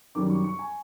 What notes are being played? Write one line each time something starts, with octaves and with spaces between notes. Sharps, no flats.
F#2 D#3 G3 D6
C#6
C#6
G#5